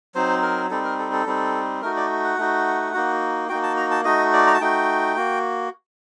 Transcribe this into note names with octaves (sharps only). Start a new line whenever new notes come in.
F#3 C4 D#4 C5
A#4
G3 C4 D#4 A4
A#4
A4
A4
G3 C4 D#4
A3 D#4 F#4 A#4
D5
F#5
A3 D#4 F#4
A#3 D#4 F#4
A#3 D#4 F#4 G5
A5
A#5
A5
A3 D#4 F#4 D#5
D5
A#5
A5
A3 D#4 F#4 G5
A#3 F#4